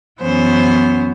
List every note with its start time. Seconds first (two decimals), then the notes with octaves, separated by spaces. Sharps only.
0.21 F#2 E3 B3 C#4 C5